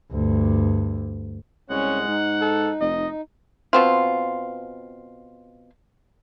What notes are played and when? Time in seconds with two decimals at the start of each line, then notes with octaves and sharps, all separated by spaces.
0.12 D2 G2
1.70 C2 G#3 C#4 C#5 F#5
2.08 G#2 D#4
2.41 A4
2.81 F1 D#5
3.73 B2 C4 F4